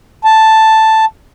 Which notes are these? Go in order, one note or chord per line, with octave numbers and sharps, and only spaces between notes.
A5